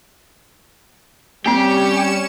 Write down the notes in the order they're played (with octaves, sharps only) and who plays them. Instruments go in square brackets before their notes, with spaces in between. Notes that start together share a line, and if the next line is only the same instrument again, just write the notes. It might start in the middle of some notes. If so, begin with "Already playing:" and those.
[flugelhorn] G3 [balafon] A#3 C4 [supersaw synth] C#4 C#7 E7 [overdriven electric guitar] G4